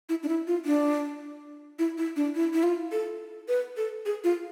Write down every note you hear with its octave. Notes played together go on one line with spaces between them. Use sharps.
E4
D4
E4
F4
D4
E4
E4
D4
E4
E4
F4
A4
B4
A4
G#4
F4